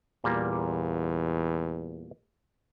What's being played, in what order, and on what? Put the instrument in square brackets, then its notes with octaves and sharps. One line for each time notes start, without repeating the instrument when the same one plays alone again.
[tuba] E2 [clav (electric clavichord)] A#2 G3 A#3